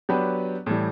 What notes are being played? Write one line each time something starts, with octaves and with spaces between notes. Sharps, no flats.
F#3 B3 D4 G4 B4
A2 E3 G3